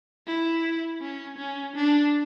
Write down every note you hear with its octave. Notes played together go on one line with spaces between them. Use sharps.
E4
C#4
C#4
D4